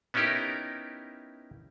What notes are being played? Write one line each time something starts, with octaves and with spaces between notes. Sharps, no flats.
B3 C#4 D#4 E4 G4 A#4